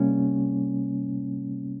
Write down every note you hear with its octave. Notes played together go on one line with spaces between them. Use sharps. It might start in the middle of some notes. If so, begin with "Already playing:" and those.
Already playing: C3 G3 A#3 C#4